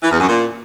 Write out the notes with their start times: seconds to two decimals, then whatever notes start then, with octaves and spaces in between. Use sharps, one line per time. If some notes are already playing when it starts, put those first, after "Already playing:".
0.03 E3
0.12 E2
0.20 F#2
0.29 A#2